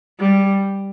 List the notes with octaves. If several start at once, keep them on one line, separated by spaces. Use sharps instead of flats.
G3